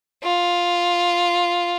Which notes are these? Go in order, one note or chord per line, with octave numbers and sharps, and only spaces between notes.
F4